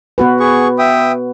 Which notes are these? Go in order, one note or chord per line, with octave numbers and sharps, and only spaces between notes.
B3 F#4 B4
G#4 C#6
E5 G5 D#6